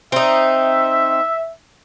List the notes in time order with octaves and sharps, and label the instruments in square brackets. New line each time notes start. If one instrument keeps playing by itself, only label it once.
[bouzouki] C4 D#4 [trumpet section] E5